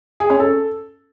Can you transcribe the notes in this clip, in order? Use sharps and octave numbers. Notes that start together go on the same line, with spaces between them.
G#4
C#4
A4